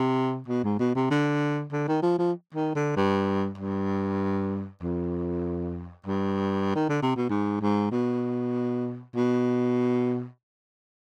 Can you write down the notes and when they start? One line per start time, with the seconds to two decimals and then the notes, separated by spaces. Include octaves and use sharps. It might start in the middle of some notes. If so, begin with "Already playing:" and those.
Already playing: C3
0.48 B2
0.64 G#2
0.79 B2
0.95 C3
1.11 D3
1.72 D3
1.88 D#3
2.03 F3
2.18 F3
2.54 D#3
2.75 D3
2.96 G2
3.58 G2
4.82 F2
6.06 G2
6.75 D#3
6.89 D3
7.02 C3
7.16 B2
7.29 G#2
7.61 G#2
7.91 B2
9.15 B2